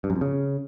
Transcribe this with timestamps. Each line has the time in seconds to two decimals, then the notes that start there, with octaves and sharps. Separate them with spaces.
0.04 G2
0.10 F#2
0.16 F2
0.21 C#3